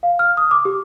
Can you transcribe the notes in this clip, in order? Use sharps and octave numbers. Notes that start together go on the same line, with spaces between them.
F5
F6
D#6
D6
G4